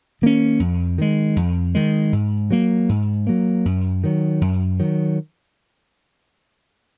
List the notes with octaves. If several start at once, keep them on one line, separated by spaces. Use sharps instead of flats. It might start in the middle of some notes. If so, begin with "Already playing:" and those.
D#3 A#3 C#4
F2
D#3 G#3
F2
D#3 G#3
G#2
F#3 A#3
G#2
F#3 A#3
F#2
D#3 F#3
F#2
D#3 F#3